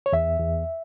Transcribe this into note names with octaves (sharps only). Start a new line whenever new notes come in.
C#5
E2 E5
E2